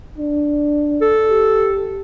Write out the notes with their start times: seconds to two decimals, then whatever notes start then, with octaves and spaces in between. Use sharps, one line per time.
0.18 D4
1.02 A4
1.30 G4